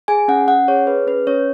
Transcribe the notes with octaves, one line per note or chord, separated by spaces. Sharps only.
G#4 G#5
C#4 F#5
C#4 F#5
G#4 C#5
G#4 B4
C#4 B4
C#4 C#5